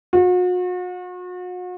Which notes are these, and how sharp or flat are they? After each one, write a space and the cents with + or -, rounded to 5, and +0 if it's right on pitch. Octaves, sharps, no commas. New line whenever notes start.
F#4 -40